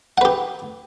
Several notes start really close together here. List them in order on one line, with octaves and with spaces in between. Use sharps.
F#5 B4 G4